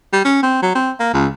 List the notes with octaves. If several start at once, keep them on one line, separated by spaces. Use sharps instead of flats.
G3
C#4
C4
F#3
C4
A#3
C#2